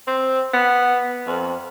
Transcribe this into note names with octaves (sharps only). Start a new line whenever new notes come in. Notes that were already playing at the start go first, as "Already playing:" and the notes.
C4
B3
F2